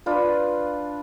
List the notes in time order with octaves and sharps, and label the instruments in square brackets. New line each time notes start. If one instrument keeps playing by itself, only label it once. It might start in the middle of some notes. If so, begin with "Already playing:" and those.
[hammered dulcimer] D4 F4 B4